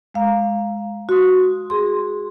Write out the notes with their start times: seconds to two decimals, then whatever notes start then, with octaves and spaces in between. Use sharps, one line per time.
0.14 G#3 F5 A#5
1.09 F#4 C6 D#6
1.70 G#4 C6